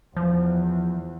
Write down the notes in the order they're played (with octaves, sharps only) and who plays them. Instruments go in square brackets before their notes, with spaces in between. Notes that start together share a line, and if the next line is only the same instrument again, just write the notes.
[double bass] E2 [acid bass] F3